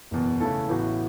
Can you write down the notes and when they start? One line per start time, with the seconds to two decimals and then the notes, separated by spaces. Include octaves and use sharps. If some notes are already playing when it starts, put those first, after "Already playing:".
0.11 F#1 E2 B2
0.40 C#3 E3 A3 E4 A4
0.69 A1 A2 E3 B3 F#4